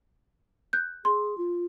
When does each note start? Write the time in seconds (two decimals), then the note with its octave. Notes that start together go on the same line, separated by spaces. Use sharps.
0.73 F#6 G6
1.05 G#4 C6
1.38 F4